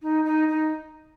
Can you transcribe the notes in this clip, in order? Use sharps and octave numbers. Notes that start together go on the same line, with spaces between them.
D#4
D#4
D#4